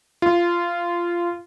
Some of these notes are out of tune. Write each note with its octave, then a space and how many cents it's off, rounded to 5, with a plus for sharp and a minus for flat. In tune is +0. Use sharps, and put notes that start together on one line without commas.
F4 -15